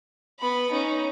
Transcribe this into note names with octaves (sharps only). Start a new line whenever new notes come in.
B3 B5
C#4 D#4